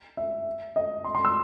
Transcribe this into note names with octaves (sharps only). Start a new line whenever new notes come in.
E5
D#5
C6
C6
E6